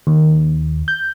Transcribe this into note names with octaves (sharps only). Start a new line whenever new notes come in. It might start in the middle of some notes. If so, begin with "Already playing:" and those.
D#2
G6